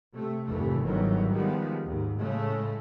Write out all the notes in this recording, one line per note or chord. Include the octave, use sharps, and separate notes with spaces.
C3 A3
F1 D#2 G#2 E3 A3
G1 G#2 D#3 E3 F#3
D#3 F3 G3 G#3 B3
D#2 G#2
A2 C#3 G#3 A3